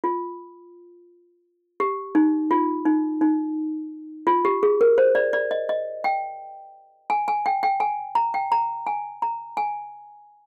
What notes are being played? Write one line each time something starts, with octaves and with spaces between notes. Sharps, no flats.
F4
G4
D#4
F4
D#4
D#4
F4
G4
G#4
A#4
C5
D5
D5
D#5
D#5
G5
G#5
G#5
G5
G5
G#5
A#5
G5
A#5
G#5
A#5
G#5